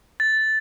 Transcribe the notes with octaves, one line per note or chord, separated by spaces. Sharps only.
A6